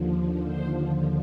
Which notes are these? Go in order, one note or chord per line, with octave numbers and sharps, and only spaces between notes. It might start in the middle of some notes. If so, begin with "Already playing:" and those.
Already playing: D#2 D3 F3
C5